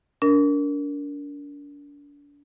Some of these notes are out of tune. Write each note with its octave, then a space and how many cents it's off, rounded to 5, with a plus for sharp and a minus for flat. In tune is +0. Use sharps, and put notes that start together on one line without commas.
D4 -35 A#4 +0